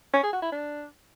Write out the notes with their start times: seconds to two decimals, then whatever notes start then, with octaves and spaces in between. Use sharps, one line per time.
0.14 C#4
0.23 G#4
0.33 F#4
0.42 E4
0.52 D4